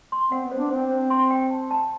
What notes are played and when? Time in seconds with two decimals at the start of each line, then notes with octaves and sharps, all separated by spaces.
0.12 C6
0.31 C4 F#5
0.45 B3
0.52 C5
0.58 D4
0.71 C4 C5
0.91 C5
1.10 C6
1.31 G5
1.50 A5
1.71 A5